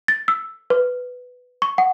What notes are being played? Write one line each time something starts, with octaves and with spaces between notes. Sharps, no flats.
A6
E6
B4
C#6
F#5